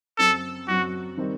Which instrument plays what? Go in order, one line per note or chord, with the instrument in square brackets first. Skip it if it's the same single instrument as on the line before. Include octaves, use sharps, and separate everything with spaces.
[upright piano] F#2 F#3 C4 [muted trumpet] A4
[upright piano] F#2 F#3 C4 [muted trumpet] F#4
[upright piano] D#3 G3 C4 D#4